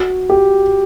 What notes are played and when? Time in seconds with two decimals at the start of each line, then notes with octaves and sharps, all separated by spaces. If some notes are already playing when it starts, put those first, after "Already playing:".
Already playing: F#4
0.30 G4